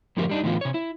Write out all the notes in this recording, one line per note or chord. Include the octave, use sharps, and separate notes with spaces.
F#2 A2 D3 F3 G4 A#4
G3 D4 D#4
A2 D3 E3 B3 C#4 F4
C3 C#5
E4